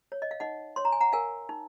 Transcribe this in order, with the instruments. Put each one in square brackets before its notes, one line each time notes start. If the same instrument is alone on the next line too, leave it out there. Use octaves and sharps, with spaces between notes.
[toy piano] C#5
D#5
F5
D#4 D#5 F#5
C#5 C6
A#5
G#5
F#5 A#5
A#4 F5 G#5
D#4